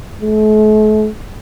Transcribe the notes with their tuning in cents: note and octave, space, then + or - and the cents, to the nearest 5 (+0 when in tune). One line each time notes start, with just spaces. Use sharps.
A3 -45